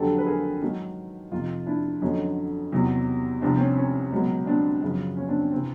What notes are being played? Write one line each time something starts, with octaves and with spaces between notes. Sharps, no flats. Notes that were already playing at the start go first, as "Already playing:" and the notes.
Already playing: F2 D3 F#3 G4 A4
B4
G#4 A#4
G#2 D#3 F#3
F2 C3 F3 D#4 F4
D4 E4
F2 D3 F#3 C#4 D#4
E2 C3 D#3 F#3
C2 C3 F3 C4 D4
C4
C#4
C#4
C#2 B2 F#3
C4 D4
F#2 C#3 F3
C#4
C4 D4
C4
C3 E3 C4